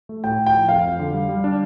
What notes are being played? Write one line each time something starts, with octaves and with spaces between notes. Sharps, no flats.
A3
A2 G5
A2
G5
F3
F2 F5
F2
D3
G3
G3
D4